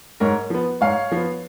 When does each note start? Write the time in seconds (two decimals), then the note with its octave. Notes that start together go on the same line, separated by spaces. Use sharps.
0.20 G#2 A#4 C#5
0.50 F3 B3
0.81 G#2 C#5 F5
1.12 F3 B3